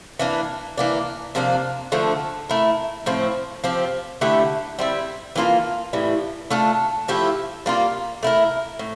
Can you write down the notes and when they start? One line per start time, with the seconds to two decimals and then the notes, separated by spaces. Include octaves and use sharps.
0.19 E3 A#3 D4
0.78 E3 A#3 D4
1.35 C3 F3 A#3 D4
1.92 D3 F3 A3
2.49 A3 E4 A#4
3.06 A2 F3 C4
3.64 F3 C4 G4
4.21 D3 A3 E4 G4
4.79 G3 C4 E4
5.36 E3 A#3 F4 A4
5.93 A2 E3 G3
6.50 A3 D4 F4 A4
7.08 F3 A3 E4 G4
7.66 G3 A#3 F4
8.23 A3 E4 A#4
8.79 A2